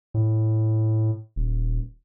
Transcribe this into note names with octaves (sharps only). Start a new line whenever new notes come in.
A2
D#1